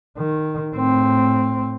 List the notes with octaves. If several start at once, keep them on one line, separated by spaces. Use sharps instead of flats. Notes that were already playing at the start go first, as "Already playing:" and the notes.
D#3
A2 C4